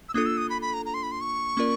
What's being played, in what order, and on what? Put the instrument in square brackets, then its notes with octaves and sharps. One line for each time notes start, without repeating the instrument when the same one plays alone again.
[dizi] E6
[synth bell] A#3 D4 F4 A4 [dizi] D#6
[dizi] E6
D#6
B5
B5
A#5
A#5
C6
B5
C6
C#6
[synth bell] A#3 C#4 F4 A#4 D5